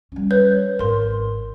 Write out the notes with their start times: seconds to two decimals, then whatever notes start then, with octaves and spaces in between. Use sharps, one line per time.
0.12 G3 C#4
0.31 B4 C#5 G6
0.79 G#1 A#4 C6